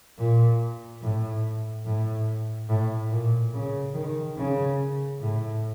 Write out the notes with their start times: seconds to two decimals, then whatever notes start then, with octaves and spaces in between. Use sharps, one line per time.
0.19 A#2
1.02 A2
1.85 A2
2.69 A2
3.11 A#2
3.53 C#3
3.94 D#3
4.37 C#3
5.20 A2